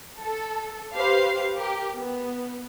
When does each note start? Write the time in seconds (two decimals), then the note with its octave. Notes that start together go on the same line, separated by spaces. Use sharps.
0.23 A4
0.95 G4 B4 C5 F5 C7
1.57 G4 A#4
1.97 B3